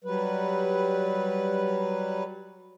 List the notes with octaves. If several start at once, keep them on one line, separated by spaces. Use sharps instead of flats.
F#3 G3 B4